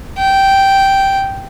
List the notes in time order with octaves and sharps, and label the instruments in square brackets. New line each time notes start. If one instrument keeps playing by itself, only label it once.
[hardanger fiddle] G5